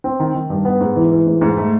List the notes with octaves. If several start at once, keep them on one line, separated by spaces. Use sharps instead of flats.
C4
D#3
D#3
G2
B3
G#2
E3
E3
G#2
G#2
A3